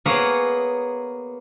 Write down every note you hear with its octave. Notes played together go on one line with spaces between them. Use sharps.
A#3 B3 G#4 C#5 E5 F5